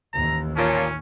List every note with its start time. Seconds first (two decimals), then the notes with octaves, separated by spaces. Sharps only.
0.13 A1 D#2 A#5
0.56 A#2 C#4 C#5 A5